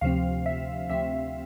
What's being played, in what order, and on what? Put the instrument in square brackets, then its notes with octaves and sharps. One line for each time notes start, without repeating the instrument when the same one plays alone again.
[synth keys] D2 C3 F3 C4 F5
E5
D2 C3 F3 C4 E5